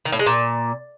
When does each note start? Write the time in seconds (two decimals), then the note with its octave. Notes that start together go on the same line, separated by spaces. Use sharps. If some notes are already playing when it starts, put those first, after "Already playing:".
0.05 D#3
0.12 A2
0.19 G#3
0.26 A#2